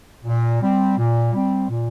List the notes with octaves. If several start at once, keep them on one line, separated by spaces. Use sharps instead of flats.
A#2
G3 C4
A#2
G3 C4
A#2